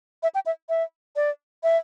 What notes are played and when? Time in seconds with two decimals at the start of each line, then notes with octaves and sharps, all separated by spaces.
0.23 E5
0.34 G5
0.46 E5
0.69 E5
1.16 D5
1.63 E5